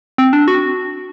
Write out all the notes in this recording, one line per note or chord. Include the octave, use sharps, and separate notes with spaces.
C4
D4
F#4